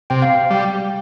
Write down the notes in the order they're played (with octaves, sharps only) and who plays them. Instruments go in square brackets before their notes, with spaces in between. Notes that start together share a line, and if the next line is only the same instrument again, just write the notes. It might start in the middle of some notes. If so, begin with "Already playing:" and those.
[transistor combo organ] C3 [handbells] G5
[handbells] F5
G5
[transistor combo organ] G3